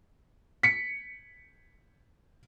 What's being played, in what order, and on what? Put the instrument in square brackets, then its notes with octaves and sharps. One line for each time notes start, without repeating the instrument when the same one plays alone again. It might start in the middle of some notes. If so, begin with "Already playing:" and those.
[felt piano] B6 C#7